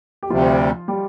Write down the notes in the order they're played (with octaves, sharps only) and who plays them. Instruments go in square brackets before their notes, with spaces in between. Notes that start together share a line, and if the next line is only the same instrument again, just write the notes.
[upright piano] G4
[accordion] D2 C3 G3 [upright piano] F3 F4
[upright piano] G3 G4